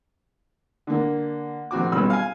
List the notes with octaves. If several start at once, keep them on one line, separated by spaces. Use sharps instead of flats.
D3 A#3
A#1 C4 F#4 D6
B1 G2 C#4 B5 E6
F5 G#5